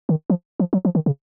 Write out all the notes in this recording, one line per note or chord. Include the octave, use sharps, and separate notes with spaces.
D#3
F3
F3
F#3
F3
D#3
C#3